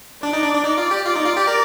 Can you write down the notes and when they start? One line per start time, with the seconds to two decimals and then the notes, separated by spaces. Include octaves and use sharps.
0.23 D4 D5
0.33 D#4
0.43 D4
0.54 D4
0.64 D#4 D5
0.77 F4
0.91 G4
1.05 F4 D5
1.16 D#4
1.25 F4
1.37 G4
1.47 A#4